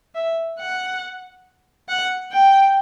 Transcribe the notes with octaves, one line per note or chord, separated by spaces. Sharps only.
E5
F#5
F#5
G5